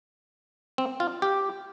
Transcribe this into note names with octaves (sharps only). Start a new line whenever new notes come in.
C4
F4
G4